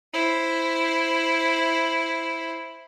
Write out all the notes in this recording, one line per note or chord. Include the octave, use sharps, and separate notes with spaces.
E4 C5